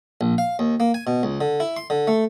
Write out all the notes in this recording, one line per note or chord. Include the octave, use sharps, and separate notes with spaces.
A#1
F5
D#2
A#3
G#5
B2
C#2
D3
E4
C6
D3
A3